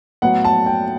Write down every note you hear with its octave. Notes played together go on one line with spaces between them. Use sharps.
A2 F#3 B3 F#5
A5
G5